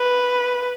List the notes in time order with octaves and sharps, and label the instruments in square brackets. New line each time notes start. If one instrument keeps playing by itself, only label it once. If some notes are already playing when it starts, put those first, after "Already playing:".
Already playing: [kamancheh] B4